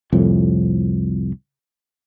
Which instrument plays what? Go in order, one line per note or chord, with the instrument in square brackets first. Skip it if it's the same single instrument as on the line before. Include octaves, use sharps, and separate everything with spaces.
[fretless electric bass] C2 F2 A2